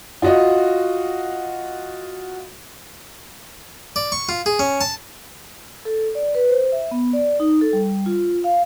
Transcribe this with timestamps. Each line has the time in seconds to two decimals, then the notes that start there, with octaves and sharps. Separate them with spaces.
0.22 F4 F#4 D#5
3.96 D5
4.12 C#6
4.29 F4
4.46 G#4
4.59 C#4
4.81 A5
5.85 A4
6.15 D5
6.35 B4
6.50 C5
6.72 E5
6.91 B3
7.13 D5
7.40 D#4
7.61 A4
7.73 G3
8.06 F4
8.44 F5